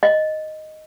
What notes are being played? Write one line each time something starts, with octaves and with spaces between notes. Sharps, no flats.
D#5